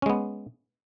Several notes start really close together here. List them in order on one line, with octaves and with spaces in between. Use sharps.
C#4 G#3 B3